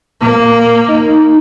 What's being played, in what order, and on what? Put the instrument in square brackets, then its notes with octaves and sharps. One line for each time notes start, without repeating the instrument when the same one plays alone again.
[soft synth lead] A#2 [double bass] A#3
[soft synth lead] D#4